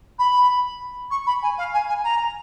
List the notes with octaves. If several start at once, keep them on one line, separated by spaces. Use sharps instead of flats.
B5
C#6
B5
G#5
F5
G#5
G#5
A#5